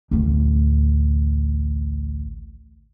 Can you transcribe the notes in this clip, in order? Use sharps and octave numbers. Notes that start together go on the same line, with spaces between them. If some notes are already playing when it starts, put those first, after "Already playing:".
A1 D2